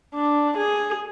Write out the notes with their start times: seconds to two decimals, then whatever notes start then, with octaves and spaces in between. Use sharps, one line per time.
0.14 D4
0.58 G#4